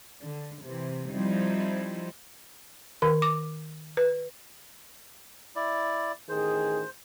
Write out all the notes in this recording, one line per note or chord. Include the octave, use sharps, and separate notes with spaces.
D3
C3 E3
F3 G3 C4 D#4 E4
D#3 A#4
D6
B4
E4 D5
A1 D#3 G#4 C5